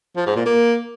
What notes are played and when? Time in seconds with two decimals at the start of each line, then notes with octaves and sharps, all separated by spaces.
0.17 F3
0.26 G#2
0.36 A#2
0.46 A#3